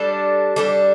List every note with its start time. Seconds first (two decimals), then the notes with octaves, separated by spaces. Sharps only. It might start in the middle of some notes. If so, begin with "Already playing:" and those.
Already playing: G3 D4 A4
0.56 G3 D4 A4